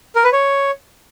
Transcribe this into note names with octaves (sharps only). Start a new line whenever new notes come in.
A#4
B4
C#5